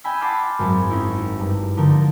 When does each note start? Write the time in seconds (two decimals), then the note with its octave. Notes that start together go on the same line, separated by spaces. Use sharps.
0.04 D#5 G5 G#5 B5 E6
0.21 F#5 A5 B5 C6 D6 F6
0.59 G#1 F#2
0.90 C#4 D#4 E4
1.39 G2
1.77 D3 F3 D#4 A#4